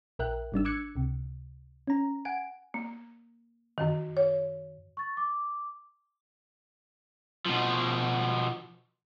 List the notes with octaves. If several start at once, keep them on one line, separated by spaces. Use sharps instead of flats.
A#1 A#4 E5 G5 F#6
G#1 G3 D4 E6
D6 E6 F#6 G#6 C#7
C#2 C3
C#4 A#5
F#5 G#5 D7
A#3
F#2 D#3
C#5
C#6 A6
D6
B2 F3